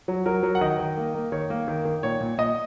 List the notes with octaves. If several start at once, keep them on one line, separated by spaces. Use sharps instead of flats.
F#3
F#3 A#4
F#3
F#5
D#3 D#5
D#3
A#3
A#3
D#3 C#5
A#3
D#3
D#3
A#2 C#5
A#2
A#2 D#5